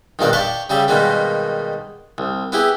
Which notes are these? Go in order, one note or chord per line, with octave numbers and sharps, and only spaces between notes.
A#1 G2 B2 D#3 D4 D5
D5 F5 G5 A5 B5 C#6
C#3 G3 G4 E5 B5
B2 D#3 G3 G#3 A#3 B3
C2
B3 E4 G4 G#4